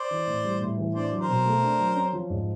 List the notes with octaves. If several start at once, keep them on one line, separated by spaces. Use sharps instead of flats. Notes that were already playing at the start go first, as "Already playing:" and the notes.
Already playing: C5 D5
E3
A2
G3
A2
E3
D4 C5 D5
F#3
A#4 C5
B2
A3
D4
F#3
C#4
F3
G#2